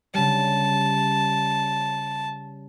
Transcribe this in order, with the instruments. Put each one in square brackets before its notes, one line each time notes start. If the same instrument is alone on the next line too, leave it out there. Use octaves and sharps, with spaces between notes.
[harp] C#3 G3 [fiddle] A5